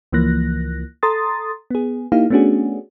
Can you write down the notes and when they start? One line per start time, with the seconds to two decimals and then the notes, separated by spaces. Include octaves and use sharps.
0.12 C#2 E3 F3 A#3 F#6 A#6
1.03 A4 A#5 C6 D#6 A6
1.71 B3 G#4
2.12 A#3 D#4 E4 G4 F5
2.30 A3 B3 C#4 D4 F#4 G#4